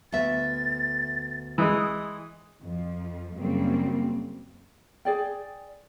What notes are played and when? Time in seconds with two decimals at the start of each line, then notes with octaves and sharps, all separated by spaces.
0.12 D2 B3 E5 A6
1.58 E3 G#3 D#6
2.61 F2 F3
3.37 F#2 C#3 G3 A#3 C4
5.05 G#4 D5 G5